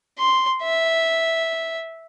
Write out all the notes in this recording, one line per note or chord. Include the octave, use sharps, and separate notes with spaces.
C6
E5